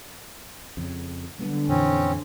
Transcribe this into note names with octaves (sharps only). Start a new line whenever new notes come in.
F2 C#3
D3 F#3 G3 B3
F2 A#2 E3 C4 C#4